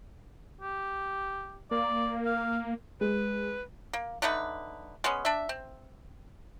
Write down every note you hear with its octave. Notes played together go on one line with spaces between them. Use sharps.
G4
A#3 D5
F5
G#3 B4
A#3
D3 A3 D#4 B4
G#3 B3 C#4
D4 E5
C4